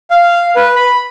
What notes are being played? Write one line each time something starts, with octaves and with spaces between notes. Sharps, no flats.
F5
B4
B5